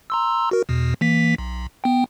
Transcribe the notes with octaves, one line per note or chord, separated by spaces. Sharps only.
A#5 C6 E6
F#4 A#4
E2 B2
E3 A#3 B6
B1
B3 G5